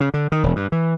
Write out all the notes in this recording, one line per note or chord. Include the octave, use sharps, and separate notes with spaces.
C#3
D3
D#3
E1
G2
E3